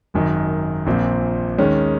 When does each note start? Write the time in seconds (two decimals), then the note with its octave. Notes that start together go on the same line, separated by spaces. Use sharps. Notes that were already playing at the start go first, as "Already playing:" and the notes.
0.14 G#1 F#2 D#3
0.86 A#1 A#2 F3 C4
1.58 D#2 D#3 G#3 C#4